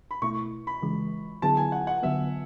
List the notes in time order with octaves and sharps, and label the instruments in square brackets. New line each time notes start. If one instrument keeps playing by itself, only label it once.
[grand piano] B5
[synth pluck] B2 A3 E4 [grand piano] C#6
[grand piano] B5
[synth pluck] C#3 E3 G#3
[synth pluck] D3 F#3 B3 E4 G#4 [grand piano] A5
[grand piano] G#5
F#5
F#5
[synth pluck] D3 F#3 B3 [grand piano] E5